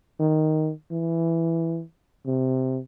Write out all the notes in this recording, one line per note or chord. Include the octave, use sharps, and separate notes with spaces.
D#3
E3
C3